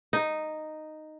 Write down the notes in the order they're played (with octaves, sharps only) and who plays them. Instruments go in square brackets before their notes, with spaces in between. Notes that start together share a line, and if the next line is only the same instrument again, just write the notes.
[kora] D#4